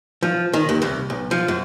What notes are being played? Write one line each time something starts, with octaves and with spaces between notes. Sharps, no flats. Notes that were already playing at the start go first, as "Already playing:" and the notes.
F3
D#3
D#2
C2
B1
F3
F#2